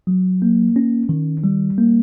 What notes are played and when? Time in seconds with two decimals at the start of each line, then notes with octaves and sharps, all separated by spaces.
0.07 F#3
0.42 A#3
0.76 C#4
1.09 D#3
1.44 G3
1.78 A#3